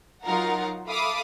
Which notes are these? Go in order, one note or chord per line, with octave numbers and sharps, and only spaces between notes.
F#3 D#4 F4 A#4 F5 F#5
A4 E5 F5 B5 D6 D#6